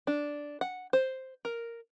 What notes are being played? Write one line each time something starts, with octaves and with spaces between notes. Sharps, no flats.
D4
F#5
C5
A#4